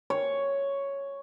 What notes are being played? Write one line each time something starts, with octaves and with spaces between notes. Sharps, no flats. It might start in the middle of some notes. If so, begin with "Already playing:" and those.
C#5